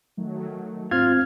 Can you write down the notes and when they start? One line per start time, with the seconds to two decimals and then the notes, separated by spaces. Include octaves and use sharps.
0.17 D#3 F#3 A3
0.91 G#2 C4 F4 F6 G#6